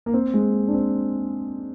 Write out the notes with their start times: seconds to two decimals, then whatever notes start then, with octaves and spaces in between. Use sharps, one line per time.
0.06 A#3
0.14 C4
0.34 G#3
0.68 D4
0.74 C4